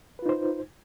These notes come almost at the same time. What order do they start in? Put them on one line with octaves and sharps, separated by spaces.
B4 F4 D#4 C5